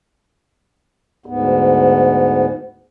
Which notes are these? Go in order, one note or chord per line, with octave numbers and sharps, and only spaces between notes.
D2 G#2 B3